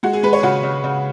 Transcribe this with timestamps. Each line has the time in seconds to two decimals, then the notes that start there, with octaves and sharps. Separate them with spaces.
0.03 G#3 F#4
0.13 G#4
0.23 G#3 B4
0.33 C#5
0.39 G#4
0.43 C#3 F#4
0.63 C#3
0.84 C#3